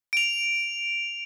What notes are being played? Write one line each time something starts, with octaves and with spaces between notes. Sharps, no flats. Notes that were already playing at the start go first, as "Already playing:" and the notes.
D7 F7